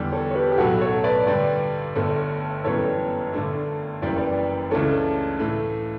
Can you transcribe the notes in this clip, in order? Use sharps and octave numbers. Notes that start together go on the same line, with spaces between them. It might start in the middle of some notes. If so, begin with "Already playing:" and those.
Already playing: E2 D3 G3
A4 C#5
C#5
G4 B4
G4
B1 A2 F#3 F#4 A4
A4 C#5
B4 D5
G2 D3 G3 B4 D5
G1 G2 D3 A3 A4 C#5
G1 F#2 E3 G3 B3 A4 C#5
G2 D3 A3 D4
F#1 F#2 E3 G3 D5
B4 D5
C#2 C#3 E3 A3 D4 A4 C#5
A2 E3 A3